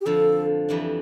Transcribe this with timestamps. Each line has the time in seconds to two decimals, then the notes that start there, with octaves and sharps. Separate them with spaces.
0.01 G4
0.06 F2 D3 F3 A4
0.69 F2 E3 G3 D4